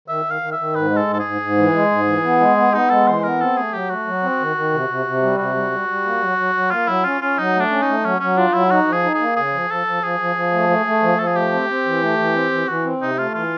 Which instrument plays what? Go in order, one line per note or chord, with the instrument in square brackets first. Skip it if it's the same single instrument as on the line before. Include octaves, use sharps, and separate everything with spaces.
[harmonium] D#3 [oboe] E5
[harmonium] D#3
[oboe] F5
[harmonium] D#3
[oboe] E5
[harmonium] D#3
[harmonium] G#2 [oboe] B4
[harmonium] G#3
[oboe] A4
[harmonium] G#2
[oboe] A4
G#4
[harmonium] G#2
G#2
E3
G#3
G#2
E3
B3
G#3
B3
[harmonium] B3 [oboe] D#4
[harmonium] G#3 [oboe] A4
[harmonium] E3 [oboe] C5
[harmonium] B3 [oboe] A#4
[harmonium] C4 [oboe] A4
[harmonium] A3 [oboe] G#4
[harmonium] F#3 [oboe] G4
[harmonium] A3 [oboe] F#4
[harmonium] F#3
C4
D#3
D#3
C3
C3
C3
G3
[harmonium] C3 [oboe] F#4
[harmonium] G3
G3
G3
A#3
F#3
F#3
F#3
[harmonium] A#3 [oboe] F4
[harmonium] F#3 [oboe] E4
[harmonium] C#4 [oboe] F4
[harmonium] C#4 [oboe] F4
[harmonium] F#3 [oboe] D#4
[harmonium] A3
[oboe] D4
[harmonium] C#4
[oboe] D#4
[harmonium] A3
[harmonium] F#3 [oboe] C#4
[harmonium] F#3 [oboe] C#4
[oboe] D4 [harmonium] F4
[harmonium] F#3 [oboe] E4
[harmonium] D#4 [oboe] F#4
[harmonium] F3
[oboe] G#4
[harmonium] D#4
[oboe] G#4
[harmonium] A#3
[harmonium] C#3 [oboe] G#4
[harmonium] F3
[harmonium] F3 [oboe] A4
[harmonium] F3
[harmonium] F3 [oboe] G#4
[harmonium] F3
F3
A3
A3
A3
F3
[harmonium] F3 [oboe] A4
[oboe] G#4
[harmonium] A3 [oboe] G4
[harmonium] C4
C4
E3
A3
E3
C4
E3
[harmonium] E3 [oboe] F#4
[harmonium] C4
[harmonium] C3 [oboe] D#4
[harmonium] A3 [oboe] F4
[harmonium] E3 [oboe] F4